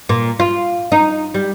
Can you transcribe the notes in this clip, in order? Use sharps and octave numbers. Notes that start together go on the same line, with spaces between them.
A#2
F4
D#4
G3